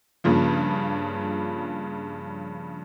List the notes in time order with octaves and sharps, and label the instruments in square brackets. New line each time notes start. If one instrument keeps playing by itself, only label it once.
[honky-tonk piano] G2 C#3 F3 A#3